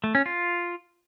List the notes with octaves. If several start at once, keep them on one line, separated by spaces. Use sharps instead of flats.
A3
C#4
F4